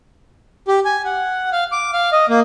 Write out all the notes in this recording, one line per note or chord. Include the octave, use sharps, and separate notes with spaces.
G4
G#5
F#5
F5
D6
F5
D#5
A#3